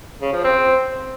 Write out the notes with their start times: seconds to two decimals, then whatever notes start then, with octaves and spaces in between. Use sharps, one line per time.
0.22 C#3
0.33 F3
0.44 C4